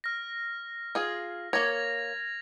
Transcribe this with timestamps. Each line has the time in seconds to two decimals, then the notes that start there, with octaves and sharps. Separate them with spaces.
0.04 F6 A#6
0.95 F4 G#4
1.53 A#3 C#5 G#6 A#6 F7